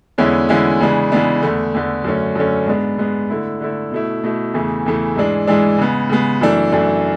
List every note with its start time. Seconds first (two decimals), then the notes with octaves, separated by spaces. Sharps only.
0.18 E2 D3 G#3 C#4 E4
0.49 E2 D3 G#3 C#4 E4
0.80 C#3 E3 G#3 B3 D4
1.12 C#3 E3 G#3 B3 D4
1.42 E2 D3 A3
1.74 E2 D3 A3
2.04 F#2 D3 A3 C#4
2.35 F#2 D3 A3 C#4
2.67 G#2 G#3 B3 D4
2.98 G#2 G#3 B3 D4
3.30 D3 A3 E4
3.61 D3 A3 E4
3.92 B2 A3 E4
4.24 B2 A3 E4
4.54 E2 C#3 E3 A3
4.86 E2 C#3 E3 A3
5.16 G#2 E3 G#3 D4
5.47 G#2 E3 G#3 D4
5.78 C#3 G#3 B3
6.09 C#3 G#3 B3
6.41 F#2 E3 A3 D4
6.72 F#2 E3 A3 D4